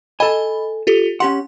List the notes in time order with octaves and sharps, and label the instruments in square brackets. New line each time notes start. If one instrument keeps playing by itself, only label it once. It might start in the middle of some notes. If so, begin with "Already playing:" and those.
[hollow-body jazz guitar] A4 G#5 [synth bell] D#5 B5
[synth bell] F4 G4 A4
[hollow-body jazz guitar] C#4 G4 F#5 [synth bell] C6